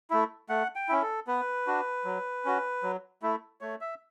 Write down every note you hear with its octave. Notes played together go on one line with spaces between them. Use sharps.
A3 E4
A3 F#5
G5
C#4 E4
A4
B3 B4
D4 F#4
F#3
C#4 F#4
F#3
A3 E4
A3 C#5
E5